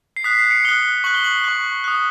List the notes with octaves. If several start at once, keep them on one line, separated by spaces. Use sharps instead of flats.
C7
D#6 F#6 B6
C7
C#7
D#6 F#6 G7
C#6 F#6 F#7
G7
F#7
C#6 F#6
D#6 F#6